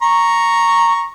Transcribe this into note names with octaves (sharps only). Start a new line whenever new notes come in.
A#5 C#6